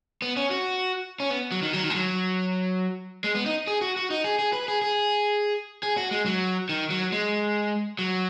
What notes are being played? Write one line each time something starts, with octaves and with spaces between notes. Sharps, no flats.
B3
C#4
F#4
C#4
B3
F#3
D#3
F#3
D#3
G#3
F#3
G#3
B3
D#4
G#4
F#4
F#4
D#4
G#4
G#4
B4
G#4
G#4
G#4
F#4
G#3
F#3
D#3
F#3
G#3
F#3